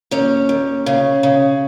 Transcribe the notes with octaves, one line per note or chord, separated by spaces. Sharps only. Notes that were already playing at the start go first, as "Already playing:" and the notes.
D#2 C#4
D#2
C#3
C#3